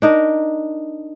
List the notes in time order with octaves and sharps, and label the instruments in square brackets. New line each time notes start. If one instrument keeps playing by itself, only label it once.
[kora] D4 D#4 A#4